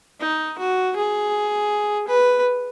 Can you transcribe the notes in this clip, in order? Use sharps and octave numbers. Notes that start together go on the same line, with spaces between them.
D#4
F#4
G#4
B4